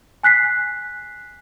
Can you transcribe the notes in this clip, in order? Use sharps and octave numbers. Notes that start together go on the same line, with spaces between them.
G#5 F#6 B6 C7